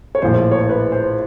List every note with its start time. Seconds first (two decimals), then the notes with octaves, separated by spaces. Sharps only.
0.15 C#5
0.22 A#1 A2 F3 C5
0.51 C#5
0.61 C5
0.69 B4
0.92 C5